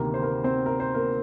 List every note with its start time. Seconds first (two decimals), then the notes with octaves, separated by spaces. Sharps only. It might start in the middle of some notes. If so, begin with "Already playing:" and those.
Already playing: D2 C3 D#3 A#3 A#4
0.14 C5
0.22 A#3 A#4
0.44 C4 C5
0.66 A#4
0.80 C5
0.94 A#3 A#4